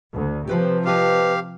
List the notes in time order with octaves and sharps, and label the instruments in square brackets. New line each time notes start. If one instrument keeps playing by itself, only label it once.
[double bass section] D2
[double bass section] C3 F3 [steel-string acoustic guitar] G4 B4 C5
[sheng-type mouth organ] G4 F5 [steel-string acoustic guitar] B4 D#5 A5